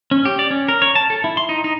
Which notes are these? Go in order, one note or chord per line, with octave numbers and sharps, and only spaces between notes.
C#4
G4
D5
C#4
A#4
C#5
A5
A4
E4
C6
D#4
D#4